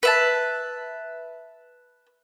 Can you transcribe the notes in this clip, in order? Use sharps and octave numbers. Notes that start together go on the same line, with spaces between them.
B4 E5 A5